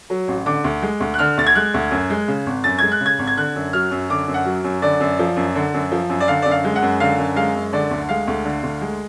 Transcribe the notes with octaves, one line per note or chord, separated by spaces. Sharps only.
F#3
A1
D3 D6
D2
G#3
D2
F#6
D3 F6
D2 A6
G#6
G#3 F#6
D2
F#2
G#3
C#3
G#1
F#2 A6
G#3 G#6
F#6
C#3
G#6
G#1
G#6
D3 F#6
F#2
F#3 F6
F#2
D3 D6
F#2
F#5
F#3
F#2
D3 D5
F#2
F3
F#2
D3
F#2
F3
F#2
D5
D3 F5
F#2 D5
F5
G#3
F#5
F#2
D3 F5
F#2
G#3 F5
F#2
D3 D5
D2
G#3 F5
D2
D3
D2
G#3